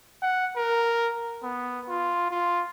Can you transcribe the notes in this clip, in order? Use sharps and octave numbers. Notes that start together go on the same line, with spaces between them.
F#5
A#4
B3
F4
F4